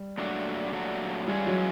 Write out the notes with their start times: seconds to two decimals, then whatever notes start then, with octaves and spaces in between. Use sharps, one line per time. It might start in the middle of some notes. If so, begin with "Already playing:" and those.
Already playing: G3
0.18 A#2 F#3 A3 D4 F#4
0.72 A#2 F#3 A3 D4 F#4
1.27 E3 G3 G#3 C#4 F4 G#4
1.47 F#3